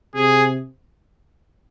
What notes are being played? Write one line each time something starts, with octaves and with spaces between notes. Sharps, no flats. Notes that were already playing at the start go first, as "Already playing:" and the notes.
C3 G#4